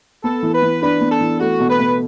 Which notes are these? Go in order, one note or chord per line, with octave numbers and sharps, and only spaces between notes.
B3 A4
E3
B4
E3
D4 B4
B3
A4
E3
A3 F#4
B2
B4
B2